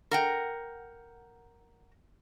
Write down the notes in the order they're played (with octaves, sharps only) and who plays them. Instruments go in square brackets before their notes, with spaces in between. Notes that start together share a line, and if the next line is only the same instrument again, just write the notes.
[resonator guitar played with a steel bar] A#4 F#5 G5